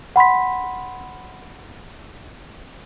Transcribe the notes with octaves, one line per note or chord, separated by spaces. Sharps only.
F#5 B5 C6 B6